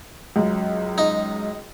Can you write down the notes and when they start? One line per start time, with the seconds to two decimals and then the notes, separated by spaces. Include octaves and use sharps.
0.36 C#2 F#2
0.98 D#4